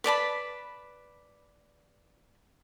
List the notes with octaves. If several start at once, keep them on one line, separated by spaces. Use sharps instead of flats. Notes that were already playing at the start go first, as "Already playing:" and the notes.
B4 D5 A5 B5